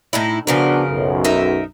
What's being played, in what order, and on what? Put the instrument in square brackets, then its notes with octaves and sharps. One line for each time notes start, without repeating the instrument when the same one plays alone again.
[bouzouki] A2 D#4 E4
[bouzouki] C#3 F3 A#4 [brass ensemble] B3 D4 F#4
[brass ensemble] B1 F#2
[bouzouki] D#4 A#4 E5